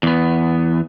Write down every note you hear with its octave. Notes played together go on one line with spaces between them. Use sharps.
E2 B3